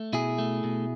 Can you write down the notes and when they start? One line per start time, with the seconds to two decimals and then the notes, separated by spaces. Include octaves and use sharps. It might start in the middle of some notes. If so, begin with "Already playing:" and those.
Already playing: A3
0.13 B2 E4 G#4
0.38 A3
0.64 B2